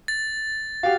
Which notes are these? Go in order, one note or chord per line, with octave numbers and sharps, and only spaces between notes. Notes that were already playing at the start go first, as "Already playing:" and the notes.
A6
F#4 G4 F5